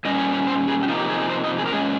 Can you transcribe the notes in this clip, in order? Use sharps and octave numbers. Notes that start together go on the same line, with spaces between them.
A#2 G3 C#4 D#5
C#5
C#5
C5
G#4
G4
C3 F3 A#3 D#4 F4
G4
G#4
G#4
C5
D#5
G#4
A#4
A#2 F3 G#3 C#4 G#4